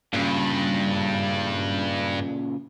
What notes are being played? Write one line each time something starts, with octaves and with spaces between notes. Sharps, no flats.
G2 A#2 C#3